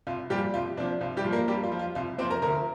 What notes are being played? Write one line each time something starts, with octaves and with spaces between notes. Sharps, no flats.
C2 F4
A#2 F3 G3 G4
C2 F4
C3 F3 D4
C2 F4
G3 G4
A#2 F3
A#3 A#4
G2 G3 G4
F4
F3
F4
C2 F4
C3 F3 C4 C5
A#4 A#5
D2 A#4 A#5